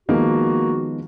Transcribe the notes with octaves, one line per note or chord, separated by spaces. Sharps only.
D#3 F3 G#3 A#3 B3 D#4 F#4